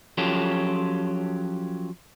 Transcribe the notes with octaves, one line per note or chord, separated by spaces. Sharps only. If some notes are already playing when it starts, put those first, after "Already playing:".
F3 F#3 C#4 F4 G4 A4